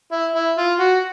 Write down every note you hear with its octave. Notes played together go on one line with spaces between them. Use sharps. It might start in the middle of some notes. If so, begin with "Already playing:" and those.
E4
E4
F4
F#4